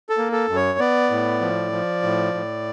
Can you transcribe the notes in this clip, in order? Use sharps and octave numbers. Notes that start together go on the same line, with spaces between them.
A4
A#3
A4
F#2
C#5
B3 D5
A2
F3
F3
A2
A2